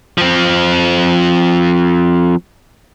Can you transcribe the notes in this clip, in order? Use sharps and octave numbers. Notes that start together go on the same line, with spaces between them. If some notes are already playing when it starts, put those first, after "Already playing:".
F3 C4